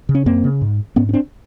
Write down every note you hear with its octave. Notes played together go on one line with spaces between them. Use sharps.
C#3
C#4
F#2 A#3 C4
C#3
G#2
G#2 B3 C#4
C#4
C4 D4